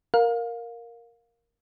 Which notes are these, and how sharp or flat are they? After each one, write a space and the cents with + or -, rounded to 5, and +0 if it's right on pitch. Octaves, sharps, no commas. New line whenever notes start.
A#4 +0 F5 +20